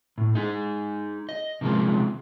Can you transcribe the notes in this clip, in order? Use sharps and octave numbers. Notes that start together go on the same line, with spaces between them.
A2
D#4 G#4
D#5
C3 D#3 F3 G#3 A#3